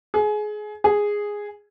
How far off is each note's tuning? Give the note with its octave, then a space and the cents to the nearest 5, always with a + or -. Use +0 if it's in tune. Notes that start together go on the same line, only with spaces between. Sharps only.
G#4 +25
G#4 -5